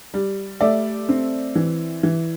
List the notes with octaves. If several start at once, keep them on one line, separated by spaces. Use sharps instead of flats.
G3
A3 D5 E5
C4
E3
E3